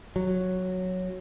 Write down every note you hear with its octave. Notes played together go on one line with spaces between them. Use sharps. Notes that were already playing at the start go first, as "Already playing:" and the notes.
F#3